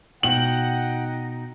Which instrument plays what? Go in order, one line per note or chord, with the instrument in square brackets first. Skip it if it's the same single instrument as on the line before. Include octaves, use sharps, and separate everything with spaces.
[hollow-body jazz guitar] B2 [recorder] D#4 [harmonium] F#5 G5 [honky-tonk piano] F#7